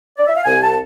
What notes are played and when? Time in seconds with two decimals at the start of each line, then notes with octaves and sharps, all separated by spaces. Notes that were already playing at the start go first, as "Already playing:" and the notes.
0.18 D5
0.27 E5
0.36 F5
0.45 C2 G#5
0.63 A5